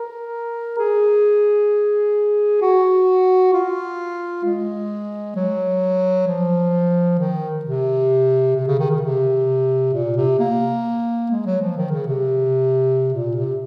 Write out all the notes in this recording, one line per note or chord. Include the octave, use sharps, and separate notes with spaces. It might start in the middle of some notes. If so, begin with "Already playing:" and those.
Already playing: A#4
G#4
F#4
F4
G#3
F#3
F3
D#3
C3
C3
C#3
D#3
C#3
C3
A#2
C3
A#3
G#3
F#3
F3
D#3
C#3
C3
A#2
C3